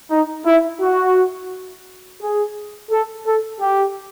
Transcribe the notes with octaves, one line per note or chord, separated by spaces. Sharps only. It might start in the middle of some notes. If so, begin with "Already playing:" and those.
D#4
E4
F#4
G#4
A4
A4
G4